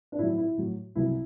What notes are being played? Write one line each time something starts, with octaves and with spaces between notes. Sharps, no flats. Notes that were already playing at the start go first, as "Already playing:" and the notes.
D4
A2 F#3 E4
E4
A2 F#3
C2 B2 F#3 E4